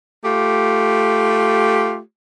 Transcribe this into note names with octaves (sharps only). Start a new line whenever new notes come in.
A3 F4 G4